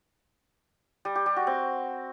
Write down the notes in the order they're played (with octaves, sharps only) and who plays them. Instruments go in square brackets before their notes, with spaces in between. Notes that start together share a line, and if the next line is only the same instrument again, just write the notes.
[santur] G3
G4
G3
F#4
C4